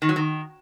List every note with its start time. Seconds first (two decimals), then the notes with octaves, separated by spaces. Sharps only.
0.02 D#3
0.09 F#3
0.16 D#3